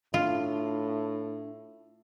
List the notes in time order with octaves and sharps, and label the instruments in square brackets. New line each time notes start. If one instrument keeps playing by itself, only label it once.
[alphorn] A2 [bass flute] D4 [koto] F4